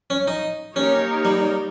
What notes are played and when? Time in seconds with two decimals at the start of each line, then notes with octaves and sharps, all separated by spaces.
0.10 C#4
0.27 D#4
0.76 A#3 C#4 D#4 G4 A#4 C#5
1.25 G3